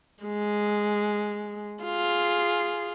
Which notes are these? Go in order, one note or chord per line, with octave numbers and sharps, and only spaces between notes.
G#3
F4 G#4